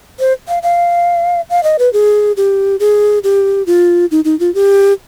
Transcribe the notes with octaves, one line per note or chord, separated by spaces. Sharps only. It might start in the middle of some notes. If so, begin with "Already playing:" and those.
C5
F5
F5
F5
D#5
B4
G#4
G4
G#4
G4
F4
D#4
D#4
F4
G4